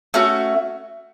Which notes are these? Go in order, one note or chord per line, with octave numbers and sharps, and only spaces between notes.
A3 C#4 F#4